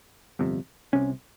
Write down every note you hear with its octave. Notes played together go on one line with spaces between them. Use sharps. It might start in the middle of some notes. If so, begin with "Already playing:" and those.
G1 F2 C3
C2 C3 C#4